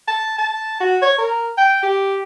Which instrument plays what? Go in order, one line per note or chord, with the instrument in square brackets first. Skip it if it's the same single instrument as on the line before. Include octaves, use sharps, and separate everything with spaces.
[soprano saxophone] A5
A5
F#4
C#5
A#4
G5
G4